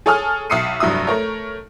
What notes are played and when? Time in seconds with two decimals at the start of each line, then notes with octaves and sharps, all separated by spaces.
0.06 G#4 A4 C#5 G#5 D#6 F6
0.50 B1 E5 D#6 C7 C#7 D#7
0.80 F1 G2 F#3 E5 D#6
1.07 A3 A#4 C#5